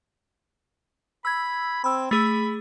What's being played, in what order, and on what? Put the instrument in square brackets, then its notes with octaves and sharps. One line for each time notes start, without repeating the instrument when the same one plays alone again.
[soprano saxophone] B5 [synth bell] E6 G#6
[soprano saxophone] C4 [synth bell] B5 E6
[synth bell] A3 G#4 E6 [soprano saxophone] B5